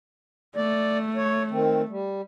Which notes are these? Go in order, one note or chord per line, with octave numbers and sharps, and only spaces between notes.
A3 D5
C#5
D#3 C4
G3